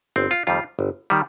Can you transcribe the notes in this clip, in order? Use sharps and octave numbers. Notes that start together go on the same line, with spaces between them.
G1 C4
F4
F2 D#3 G3 F4
G1
D#3 G3